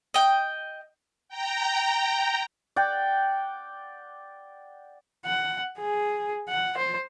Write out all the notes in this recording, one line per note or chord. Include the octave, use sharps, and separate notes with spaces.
D#5 G5
G5 A#5
D5 F#5 G5
F#5
G#4
F#5
C5